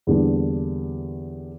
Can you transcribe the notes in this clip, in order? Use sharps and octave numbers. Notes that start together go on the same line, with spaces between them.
E2 D3 G3 A#3 D4